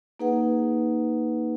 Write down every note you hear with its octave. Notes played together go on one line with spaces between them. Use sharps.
A#3 D#4 G#4 B4 F#5